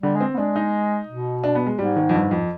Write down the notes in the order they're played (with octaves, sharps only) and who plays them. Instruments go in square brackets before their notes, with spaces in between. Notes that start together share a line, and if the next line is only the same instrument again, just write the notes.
[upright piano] D3 [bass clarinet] G3
[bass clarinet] G#3
[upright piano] C4
[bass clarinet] B3
[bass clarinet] G#3 [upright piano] D4
[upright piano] D#4
[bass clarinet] B2
[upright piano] D4
B3
G#3
[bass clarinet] G#2 [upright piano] G3
[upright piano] D#3
F2
G2
F2